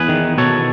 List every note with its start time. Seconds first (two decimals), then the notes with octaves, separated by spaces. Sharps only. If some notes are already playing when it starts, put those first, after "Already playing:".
Already playing: E2 G#4 B4
0.09 D#3
0.38 B2 A4 C#5